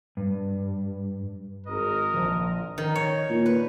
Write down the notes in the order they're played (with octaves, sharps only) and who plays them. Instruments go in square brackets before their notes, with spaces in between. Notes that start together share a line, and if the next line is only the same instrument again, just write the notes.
[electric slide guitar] G2
[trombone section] G#1 [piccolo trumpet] A#4 [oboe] D#5
[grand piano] A#1 [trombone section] F3
[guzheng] D#3
C#5
[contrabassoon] A#2
[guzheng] B4